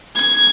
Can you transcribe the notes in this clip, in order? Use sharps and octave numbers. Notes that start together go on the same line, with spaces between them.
G#6